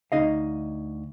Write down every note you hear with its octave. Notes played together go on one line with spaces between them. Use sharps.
D2 D#4 D#5 F5